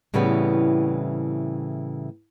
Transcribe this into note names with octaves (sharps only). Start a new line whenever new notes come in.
A2 C#3 E3 G3 B3 C4